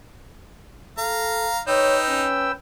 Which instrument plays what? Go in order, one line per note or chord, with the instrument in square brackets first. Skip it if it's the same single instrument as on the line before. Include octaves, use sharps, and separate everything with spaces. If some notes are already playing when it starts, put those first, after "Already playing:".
[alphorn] A4 [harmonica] F5 A#5
[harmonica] D#4 [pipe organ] B4 G5 E6 [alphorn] C#5
[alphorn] C#4